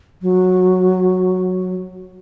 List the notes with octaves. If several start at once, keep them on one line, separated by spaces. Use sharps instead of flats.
F#3